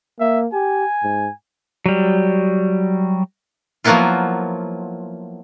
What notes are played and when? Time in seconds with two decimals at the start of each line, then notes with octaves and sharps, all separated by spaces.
0.20 A#3 E5
0.53 G4 G#5
1.03 G#2
1.86 F#3 G3
3.84 F3 F#3 A#3 B3 E4 F4